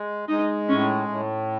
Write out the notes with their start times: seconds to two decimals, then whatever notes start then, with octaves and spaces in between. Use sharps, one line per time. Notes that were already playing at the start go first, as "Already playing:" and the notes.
Already playing: G#3
0.28 G#3 D#4
0.69 A2 C#4
1.08 A2